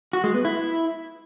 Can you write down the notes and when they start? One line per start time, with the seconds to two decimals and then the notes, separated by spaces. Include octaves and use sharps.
0.13 F#4
0.24 G#3
0.34 B3
0.45 E4